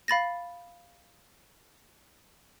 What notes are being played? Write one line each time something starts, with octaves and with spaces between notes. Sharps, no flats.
F5 B5 A6 A#6